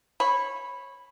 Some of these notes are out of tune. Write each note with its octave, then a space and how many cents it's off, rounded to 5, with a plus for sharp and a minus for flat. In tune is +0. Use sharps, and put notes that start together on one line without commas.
C#5 -25 B5 +0